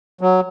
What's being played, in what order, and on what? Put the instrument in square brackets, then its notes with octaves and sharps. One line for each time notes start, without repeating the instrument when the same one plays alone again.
[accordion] F#3